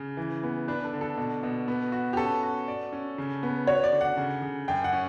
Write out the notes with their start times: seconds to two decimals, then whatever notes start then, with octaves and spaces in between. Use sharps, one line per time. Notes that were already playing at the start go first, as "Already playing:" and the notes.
Already playing: C#3
0.17 E3
0.43 B3
0.68 D4 B4
0.85 A4
0.93 D3
1.01 A4
1.17 B2
1.43 B2
1.68 B3
1.92 F#4
2.13 G4
2.17 C#4 A4
2.43 F#4
2.68 D5
2.93 C#4
3.18 C#3
3.43 B3
3.67 F#4 C#5
3.84 D5
3.92 D3
4.01 F#5
4.17 C#3
4.42 C#3
4.68 F#2 G5
4.84 F#5
4.93 C#4